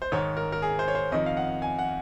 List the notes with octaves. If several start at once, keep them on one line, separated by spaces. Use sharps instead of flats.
C5
G#2 D#3 C#5
A#4
A#4
G#4
C5
C#5
C5
F2 D#3 D#5
F5
F#5
G#5
F#5